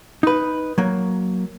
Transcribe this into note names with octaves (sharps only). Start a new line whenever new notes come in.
D#4 B4
F#3 A#3